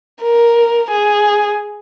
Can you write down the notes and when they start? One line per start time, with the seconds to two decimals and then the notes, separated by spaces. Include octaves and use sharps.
0.22 A#4
0.89 G#4